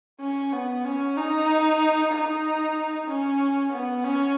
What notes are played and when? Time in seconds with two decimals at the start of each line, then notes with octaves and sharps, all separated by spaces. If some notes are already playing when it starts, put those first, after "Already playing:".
0.21 C#4
0.53 B3
0.85 C#4
1.17 D#4
2.13 D#4
3.09 C#4
3.73 B3
4.04 C#4